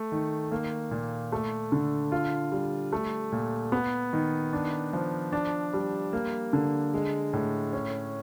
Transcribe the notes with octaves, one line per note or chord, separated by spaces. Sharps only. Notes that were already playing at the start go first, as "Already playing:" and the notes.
Already playing: A3
D#3
A#3
A#2
A3
D3
F4
G3
A3
A#2
B3
D#3
D4
F3
D4
G3
A#3
D3
G#3
A2
C#4